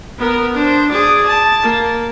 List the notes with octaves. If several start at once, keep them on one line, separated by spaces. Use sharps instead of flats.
B3 A#4
D4 C5
G#4 D5
A5
A#3